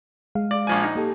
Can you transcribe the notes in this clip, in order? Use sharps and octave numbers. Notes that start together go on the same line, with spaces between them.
G#3 F5
D5
A#1 F3 G#5
D#4
A#3 G4 A4